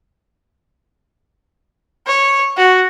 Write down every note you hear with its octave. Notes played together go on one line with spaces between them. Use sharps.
C#5
F#4